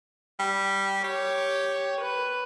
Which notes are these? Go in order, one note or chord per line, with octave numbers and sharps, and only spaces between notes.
G3
G4 C#5
B4